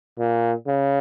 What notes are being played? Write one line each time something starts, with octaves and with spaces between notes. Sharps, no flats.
A#2
C#3